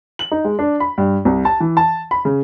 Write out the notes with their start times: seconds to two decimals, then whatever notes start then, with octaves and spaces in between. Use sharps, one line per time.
0.19 F#7
0.31 D#4
0.44 G#3
0.59 D4
0.80 B5
0.98 G2
1.25 C2
1.45 A5
1.60 E3
1.77 A5
2.11 B5
2.25 C#3